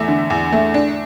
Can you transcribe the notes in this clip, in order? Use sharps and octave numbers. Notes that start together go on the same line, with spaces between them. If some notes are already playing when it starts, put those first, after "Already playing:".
Already playing: E2 A3 E5
D3
E2
A3
D4